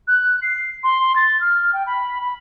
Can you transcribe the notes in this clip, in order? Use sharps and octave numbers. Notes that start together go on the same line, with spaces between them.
F#6
C7
C6
A6
F6
G5
B5
B5